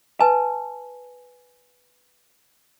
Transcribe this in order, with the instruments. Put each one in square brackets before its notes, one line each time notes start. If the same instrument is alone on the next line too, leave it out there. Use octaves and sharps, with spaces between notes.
[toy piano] B4 G#5 [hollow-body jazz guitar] A5